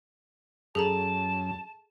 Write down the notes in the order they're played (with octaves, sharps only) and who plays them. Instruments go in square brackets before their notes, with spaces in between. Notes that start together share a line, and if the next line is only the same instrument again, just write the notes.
[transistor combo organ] F#2 [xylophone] G#4 A4 A#5 [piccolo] A5